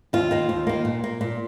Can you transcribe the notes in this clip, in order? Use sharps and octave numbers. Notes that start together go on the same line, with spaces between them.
D#2 F4
D#3 A#3
D#2
D#3 A#3
A#2
A#3
A#2